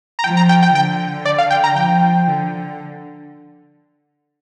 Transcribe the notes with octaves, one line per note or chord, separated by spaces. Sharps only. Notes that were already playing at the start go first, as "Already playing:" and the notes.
A#5
F3 G5
A#5
G5
G5
D3 G5
D5
F5
G5
A#5
F3 G5
D3